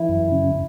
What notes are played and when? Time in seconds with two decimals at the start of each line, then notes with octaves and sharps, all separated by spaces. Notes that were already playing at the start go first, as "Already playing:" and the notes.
Already playing: E3 E4
0.09 F#2
0.32 C#3